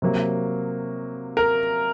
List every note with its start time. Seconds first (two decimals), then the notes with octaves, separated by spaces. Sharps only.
0.02 C3 F#3 A#3
1.37 A#4